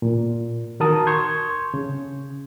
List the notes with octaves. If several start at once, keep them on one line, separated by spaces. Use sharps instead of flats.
A#2
D#3 F#4 A#4 A5 D#6
C6 C#6 G6 G#6
C#3